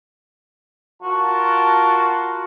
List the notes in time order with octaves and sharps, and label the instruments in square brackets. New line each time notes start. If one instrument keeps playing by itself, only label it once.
[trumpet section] F4 A#4 A5 [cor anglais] F#4